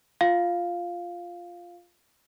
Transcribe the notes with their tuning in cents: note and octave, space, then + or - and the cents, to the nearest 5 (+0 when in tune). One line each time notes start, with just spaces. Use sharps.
F4 +0 F5 +0